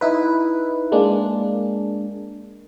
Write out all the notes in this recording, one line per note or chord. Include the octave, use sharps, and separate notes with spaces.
D#4 E4 B4
G#3 A#3 D4